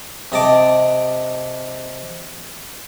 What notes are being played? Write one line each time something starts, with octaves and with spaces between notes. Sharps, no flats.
C3 D#5 A5 D6